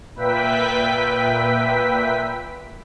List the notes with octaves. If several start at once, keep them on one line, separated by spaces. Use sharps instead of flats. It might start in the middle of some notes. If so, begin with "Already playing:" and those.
A#2 B4 E5 G5 B6